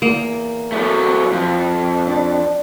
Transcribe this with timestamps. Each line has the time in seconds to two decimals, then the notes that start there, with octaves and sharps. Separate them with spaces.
0.02 E2 A#3
0.72 F#3 A3
1.32 F2 C4
2.07 D4